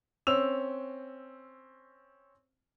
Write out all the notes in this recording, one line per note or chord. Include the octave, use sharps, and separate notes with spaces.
C4 C#4 E6 F7